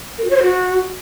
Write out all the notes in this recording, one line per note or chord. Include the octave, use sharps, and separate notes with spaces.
A#4
F#4
C#5
C5
F#4